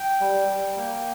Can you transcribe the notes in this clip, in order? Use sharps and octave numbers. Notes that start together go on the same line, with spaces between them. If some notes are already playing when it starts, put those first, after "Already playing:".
Already playing: G5
G3
G3
A#3